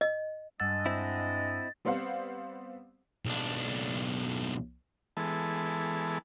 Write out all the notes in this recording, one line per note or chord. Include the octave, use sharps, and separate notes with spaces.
D#5
G2 G#3 D4 D#5 F#5 E6 A6
C4 E4
G3 B3 C4 C5 F5 F#5
B1 D4
E3 G#3 B3 A4